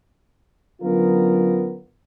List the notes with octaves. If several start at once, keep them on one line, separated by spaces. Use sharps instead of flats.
D3 F#3 B3 C#4 F4 A#4